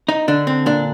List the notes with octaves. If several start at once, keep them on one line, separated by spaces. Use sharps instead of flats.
D#4
D3 D4
C4
A#2 D4